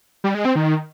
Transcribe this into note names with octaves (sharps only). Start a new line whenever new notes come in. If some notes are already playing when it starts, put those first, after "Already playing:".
G3
G#3
C4
D#3